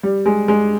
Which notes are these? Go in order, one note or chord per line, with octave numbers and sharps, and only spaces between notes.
G3
G#3
G#3